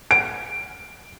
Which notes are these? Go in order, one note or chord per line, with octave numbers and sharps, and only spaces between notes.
D7